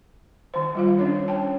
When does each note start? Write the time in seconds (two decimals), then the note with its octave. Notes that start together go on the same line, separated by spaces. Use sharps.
0.54 D#3 C5
0.75 G3 F4 F5
0.99 C#4 D4 C#5
1.28 C#5 G5 A5